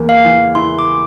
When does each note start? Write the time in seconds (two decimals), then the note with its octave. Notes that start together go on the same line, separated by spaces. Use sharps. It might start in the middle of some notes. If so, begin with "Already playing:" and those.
Already playing: E2 A#3
0.09 F5
0.25 E3
0.55 E4 C6
0.79 D6